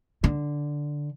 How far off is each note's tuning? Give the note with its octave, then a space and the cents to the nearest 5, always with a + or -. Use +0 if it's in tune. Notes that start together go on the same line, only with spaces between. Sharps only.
D3 +0